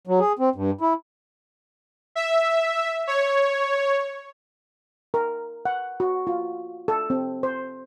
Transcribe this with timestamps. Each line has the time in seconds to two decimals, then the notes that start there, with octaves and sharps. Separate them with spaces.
0.07 F#3
0.20 G#4
0.39 C4
0.55 G2
0.81 E4
2.16 E5
3.07 C#5
5.14 A#4
5.65 F#5
6.00 F#4
6.27 F4
6.88 A4
7.10 C4
7.43 C5